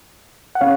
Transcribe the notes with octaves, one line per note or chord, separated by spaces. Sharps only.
F#5
C#3 C#5 F5